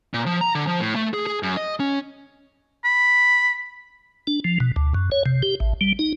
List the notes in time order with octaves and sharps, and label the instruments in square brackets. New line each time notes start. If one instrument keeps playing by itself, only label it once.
[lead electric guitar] A#2
F3
A#5
D3
F3
A2
A3
G#4
G#4
F#2
D#5
C#4
[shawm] B5
[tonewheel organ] D4
F3
B2
D2
F#2
C#5
C3
G4
A1
G3
D#4